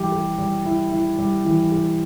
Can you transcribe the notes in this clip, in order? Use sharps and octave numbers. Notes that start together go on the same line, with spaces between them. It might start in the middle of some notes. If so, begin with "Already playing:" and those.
Already playing: E3 G3 E4 G4
G4
G3
E4
E4
G3
E3
G4